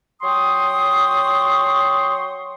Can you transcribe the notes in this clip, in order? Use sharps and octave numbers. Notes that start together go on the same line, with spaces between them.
F#3 G5 C6 C#6 D#6